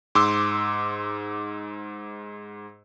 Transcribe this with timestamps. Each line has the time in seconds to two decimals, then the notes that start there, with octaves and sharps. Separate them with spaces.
0.15 G#2 C6 D6 E6